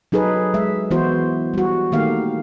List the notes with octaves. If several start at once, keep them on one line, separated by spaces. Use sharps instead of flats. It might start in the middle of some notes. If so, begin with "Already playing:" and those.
F#3 D#4 G#4 A4 B4
G#3 E5
E3 B3 E4 F#4 C5
G3 F#4
D#3 A3 A#3 G4 F5